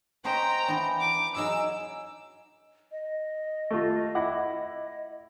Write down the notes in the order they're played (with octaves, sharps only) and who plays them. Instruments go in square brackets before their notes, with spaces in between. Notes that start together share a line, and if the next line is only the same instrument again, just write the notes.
[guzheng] C#4 C5 D#5 [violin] G5 A#5
[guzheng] E3 B3 D4
[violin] D6
[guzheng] F#3 D#4 G#4 [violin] E6
[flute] D#5
[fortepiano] A3 F4
E4 F#5 D6